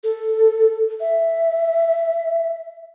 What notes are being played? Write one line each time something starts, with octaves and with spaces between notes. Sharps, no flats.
A4
E5